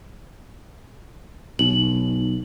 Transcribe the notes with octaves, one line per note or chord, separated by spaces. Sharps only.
B1 D#4 F#7